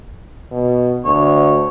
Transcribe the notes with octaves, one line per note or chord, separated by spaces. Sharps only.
B2
D2 C#5